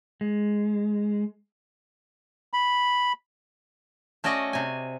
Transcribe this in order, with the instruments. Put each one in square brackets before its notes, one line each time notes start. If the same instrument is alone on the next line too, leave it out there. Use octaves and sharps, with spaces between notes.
[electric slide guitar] G#3
[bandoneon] B5
[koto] A3 C#4 F#4 D5 D#5
C3 G#5